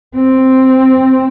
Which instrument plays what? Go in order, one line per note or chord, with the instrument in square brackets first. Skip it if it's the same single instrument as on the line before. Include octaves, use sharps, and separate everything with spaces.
[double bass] C4